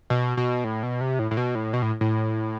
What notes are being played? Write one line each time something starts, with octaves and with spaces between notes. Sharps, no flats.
B2
B2
A2
B2
C3
A2
A2
B2
A2
B2
A2
A2